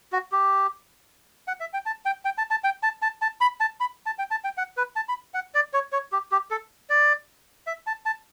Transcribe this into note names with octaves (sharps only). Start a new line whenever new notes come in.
F#4
G4
F#5
E5
G5
A5
G5
G5
A5
A5
G5
A5
A5
A5
B5
A5
B5
A5
G5
A5
G5
F#5
B4
A5
B5
F#5
D5
C#5
C#5
G4
G4
A4
D5
E5
A5
A5